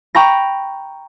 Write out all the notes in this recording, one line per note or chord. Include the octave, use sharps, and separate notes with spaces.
G5 A#5 B5 C#6 G6 A#6